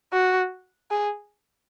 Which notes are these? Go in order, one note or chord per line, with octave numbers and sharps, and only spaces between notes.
F#4
G#4